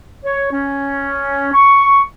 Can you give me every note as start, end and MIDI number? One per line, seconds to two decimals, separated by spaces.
0.23 0.50 73
0.52 1.51 61
1.53 2.01 85